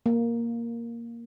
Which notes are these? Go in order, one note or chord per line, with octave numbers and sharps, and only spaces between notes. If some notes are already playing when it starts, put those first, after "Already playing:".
A#3